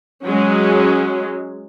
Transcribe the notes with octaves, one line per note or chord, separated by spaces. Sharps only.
F#3 G#3 C#4